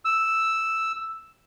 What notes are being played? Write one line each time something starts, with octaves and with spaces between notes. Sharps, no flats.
E6